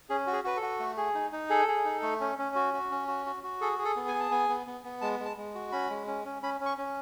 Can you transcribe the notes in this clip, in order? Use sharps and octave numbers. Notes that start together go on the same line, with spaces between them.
C#4 G#4
F#4
G#4
F#4 B4
A4
F#4
A3
G#4
D#4
D#4
G#4 A4
G#4
D#4
A3
C#4
C#4
F#4
F#4
C#4
F#4
F#4
F#4
G#4 A4
G#4
A4
B3
G#5
G#4
A5
B3 G#5
B3
B3
B3
G#3 A5
G#3
A5
G#3
F#4
C#4 B5
G#3
C#4
C#4
C#4 B5
C#4
C#6
C#4